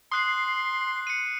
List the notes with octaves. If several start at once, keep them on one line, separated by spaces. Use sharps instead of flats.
C6 D#6 F#6 C7
C#7 D#7